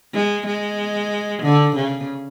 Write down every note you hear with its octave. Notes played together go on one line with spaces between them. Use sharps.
G#3
G#3
D3
C#3